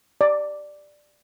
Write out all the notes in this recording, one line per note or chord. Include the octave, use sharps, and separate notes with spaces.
D5